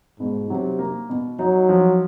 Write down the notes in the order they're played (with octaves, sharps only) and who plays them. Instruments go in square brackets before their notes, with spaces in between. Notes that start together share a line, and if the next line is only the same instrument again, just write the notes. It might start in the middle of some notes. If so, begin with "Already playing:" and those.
[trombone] G#2 [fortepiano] B2
[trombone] C3 [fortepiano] F#3
[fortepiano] A#3
B2
[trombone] F#3 [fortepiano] D#4
[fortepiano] F3